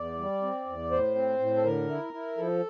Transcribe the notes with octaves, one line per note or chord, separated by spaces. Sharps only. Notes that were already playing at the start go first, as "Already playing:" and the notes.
Already playing: E2 D5
G3
C4
E2
A2 C5
C4
A2
A4
D3 A#4
E4
E4
F3 A4